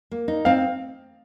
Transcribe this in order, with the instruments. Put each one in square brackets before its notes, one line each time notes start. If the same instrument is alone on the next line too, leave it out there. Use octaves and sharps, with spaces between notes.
[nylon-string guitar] A#3
D#4
[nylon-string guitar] C4 [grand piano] F5